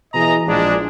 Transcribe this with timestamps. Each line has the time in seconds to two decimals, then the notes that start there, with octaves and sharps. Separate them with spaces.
0.14 B2 E3 G#4 D#5 A#5
0.46 A#1 G#3 D4